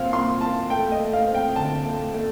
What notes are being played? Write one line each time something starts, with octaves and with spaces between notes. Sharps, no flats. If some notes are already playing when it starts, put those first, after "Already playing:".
Already playing: A#2 C4 F5
A#2 C6
A#2 A5
A3 G5
D#5
A3
F5
C4
G5
D3 A5
A3
A3